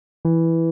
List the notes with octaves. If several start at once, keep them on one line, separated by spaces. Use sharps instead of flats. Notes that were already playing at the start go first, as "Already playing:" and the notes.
E3